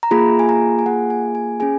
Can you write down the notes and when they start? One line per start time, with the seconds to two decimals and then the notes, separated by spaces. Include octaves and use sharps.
0.03 A#5
0.11 A#3 F4 G#4 B5
0.39 G#5
0.49 A#5
0.79 G#5
0.86 A#3 F4 G#4 F#5
1.10 G#5
1.35 G#5
1.60 C#4 G#4 G#5